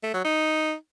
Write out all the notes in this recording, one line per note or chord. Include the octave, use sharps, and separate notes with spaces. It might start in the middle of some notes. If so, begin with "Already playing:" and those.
A3
F#3
D#4